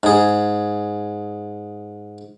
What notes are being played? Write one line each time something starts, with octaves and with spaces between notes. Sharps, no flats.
G#2 G#4